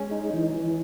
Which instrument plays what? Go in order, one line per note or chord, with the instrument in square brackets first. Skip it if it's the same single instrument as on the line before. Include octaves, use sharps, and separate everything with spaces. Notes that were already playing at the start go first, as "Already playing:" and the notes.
Already playing: [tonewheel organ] G#3 [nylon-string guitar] C#4
[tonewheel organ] D#4
E3
E3